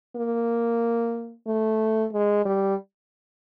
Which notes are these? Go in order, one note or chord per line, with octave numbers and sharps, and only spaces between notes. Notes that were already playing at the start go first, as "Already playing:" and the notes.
A#3
A3
G#3
G3